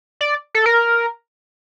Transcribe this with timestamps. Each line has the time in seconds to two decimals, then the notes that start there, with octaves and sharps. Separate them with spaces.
0.21 D5
0.55 A4
0.66 A#4